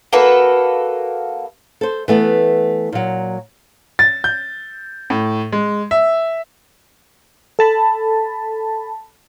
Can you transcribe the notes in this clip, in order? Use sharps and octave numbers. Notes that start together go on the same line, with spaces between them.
A#3 F#4 A4 B4
A4 C5
E3 A3 B3
A#2 F#3
A6
G6
A2
G#3
E5
A4 A5 B5